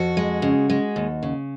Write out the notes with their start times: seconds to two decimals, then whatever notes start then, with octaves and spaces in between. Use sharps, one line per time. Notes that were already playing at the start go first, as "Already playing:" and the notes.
Already playing: F2 F#4
0.17 G#3
0.42 C#3
0.70 G#3
0.96 D#2
1.23 C#3